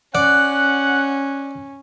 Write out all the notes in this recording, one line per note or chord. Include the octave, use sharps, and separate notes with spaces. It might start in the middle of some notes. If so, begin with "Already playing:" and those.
C#4 D5 F#5 F#6